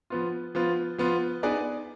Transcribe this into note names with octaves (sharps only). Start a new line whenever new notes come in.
F3 B3 F4
F3 B3 F4
F3 B3 F4
B3 D#4 G#4 B4 D5